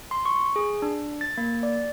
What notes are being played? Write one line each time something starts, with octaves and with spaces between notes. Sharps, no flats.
C6
C#6
G#4
D4
A6
A#3
D5